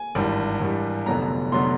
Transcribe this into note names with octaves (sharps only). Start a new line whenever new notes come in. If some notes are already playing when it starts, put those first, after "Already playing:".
Already playing: G#5
G#1 G2 E3 G3
G#1 G2 E3 G3
F1 F2 D3 F#3 B3 A#5
F1 D3 F#3 B3 C6